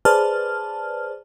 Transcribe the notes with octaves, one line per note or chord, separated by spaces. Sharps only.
G#4 B4 C5 D5 A5 F6